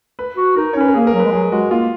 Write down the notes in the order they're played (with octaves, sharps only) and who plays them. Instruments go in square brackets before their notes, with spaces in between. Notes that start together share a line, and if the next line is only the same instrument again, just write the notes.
[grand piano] B4
[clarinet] F#4
[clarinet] D#4 [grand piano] A#4
[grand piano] C#5
[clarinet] C#4 [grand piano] B4
[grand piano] A#4
[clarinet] A#3 [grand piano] G#4
[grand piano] A#4
[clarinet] F#3
[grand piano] B4
[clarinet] G#3
[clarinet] F#3 [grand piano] G#4
[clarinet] G#3 [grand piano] F#4
[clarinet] A#3 [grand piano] F4